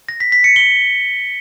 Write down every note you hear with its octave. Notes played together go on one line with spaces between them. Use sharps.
A#6
B6
B6
C#7
G7